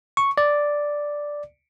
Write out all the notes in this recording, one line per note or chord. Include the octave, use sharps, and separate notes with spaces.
C#6
D5